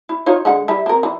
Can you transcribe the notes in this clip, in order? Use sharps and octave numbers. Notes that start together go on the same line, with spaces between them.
E4
D#4 F4 C#5
D3 G#3 F#5
G3 E4 E5
C4 A#4
E3